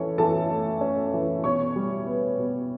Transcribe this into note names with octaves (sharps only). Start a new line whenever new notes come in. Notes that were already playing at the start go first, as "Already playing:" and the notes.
Already playing: E3 C#4 A4 C#5
E3 A4 A5
A3
C#4
E3
B2 C#5 C#6
G3
B3
B2